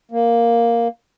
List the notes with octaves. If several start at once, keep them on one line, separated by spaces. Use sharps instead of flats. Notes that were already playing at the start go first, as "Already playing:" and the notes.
A#3